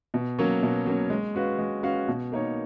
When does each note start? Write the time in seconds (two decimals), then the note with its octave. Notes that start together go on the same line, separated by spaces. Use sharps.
0.14 B2
0.39 F#3 A#3 C#4
0.63 B2
0.86 F#3 A#3 C#4
1.10 G#3
1.35 C#4 F#4 B4 F5
1.59 G#3
1.83 C#4 F#4 B4 F5
2.08 B2
2.32 A#3 D#4 A#4 C#5